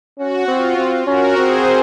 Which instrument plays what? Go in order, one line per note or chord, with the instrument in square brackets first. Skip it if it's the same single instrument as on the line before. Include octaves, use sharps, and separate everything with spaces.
[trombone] C#4 [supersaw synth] F#4
[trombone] C4 [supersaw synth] F4
[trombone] C4
[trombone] C#4 [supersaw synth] F#4 A#4
[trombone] C4 [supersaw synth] G#4 C5